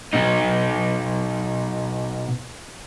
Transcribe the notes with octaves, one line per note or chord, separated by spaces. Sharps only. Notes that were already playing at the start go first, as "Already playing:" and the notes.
B2 D#4